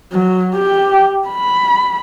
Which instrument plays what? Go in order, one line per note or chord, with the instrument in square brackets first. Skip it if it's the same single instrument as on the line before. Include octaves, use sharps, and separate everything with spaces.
[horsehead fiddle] F#3
G4
B5